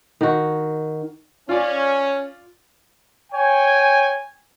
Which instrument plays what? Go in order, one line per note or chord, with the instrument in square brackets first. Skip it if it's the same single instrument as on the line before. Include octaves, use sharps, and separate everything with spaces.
[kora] D#3 F#4
[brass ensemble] C#4 [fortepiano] F4 D5
[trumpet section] C#5 G5 G#5